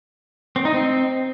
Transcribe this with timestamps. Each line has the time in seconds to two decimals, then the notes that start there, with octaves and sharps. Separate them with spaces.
0.56 C4
0.65 D#4
0.74 C4